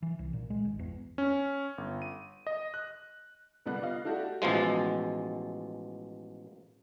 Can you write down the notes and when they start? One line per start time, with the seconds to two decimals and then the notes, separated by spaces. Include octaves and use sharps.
0.02 E3
0.19 C2
0.33 A#2
0.50 G#3
0.65 G#1
0.79 E2
1.18 C#4
1.78 G1
2.02 D#7
2.47 D#5
2.74 F#6
3.66 C2 D3 G3 B3 F#6
3.81 F4 D5 D#5 F5
4.04 A3 D4 E4 F#4 G4 A4
4.42 A1 B2 F3 G#3